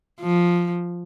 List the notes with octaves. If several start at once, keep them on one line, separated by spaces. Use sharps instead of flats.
F3